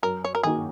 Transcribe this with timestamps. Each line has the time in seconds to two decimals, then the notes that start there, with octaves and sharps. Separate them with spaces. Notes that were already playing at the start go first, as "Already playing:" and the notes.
0.03 F#2 A#4
0.24 C#5
0.35 A#4
0.43 D#3 A#3 D#4 F#4 G#4